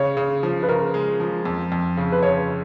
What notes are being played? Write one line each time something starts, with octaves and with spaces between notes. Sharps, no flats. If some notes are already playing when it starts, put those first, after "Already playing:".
Already playing: C#3 C#5
C#3
F3
B4
C#3 A#4
G#3
F3
F2
F2
C#3
B4
C#3 C#5